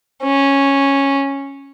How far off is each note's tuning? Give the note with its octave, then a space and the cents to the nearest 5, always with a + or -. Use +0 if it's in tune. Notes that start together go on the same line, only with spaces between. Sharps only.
C#4 -5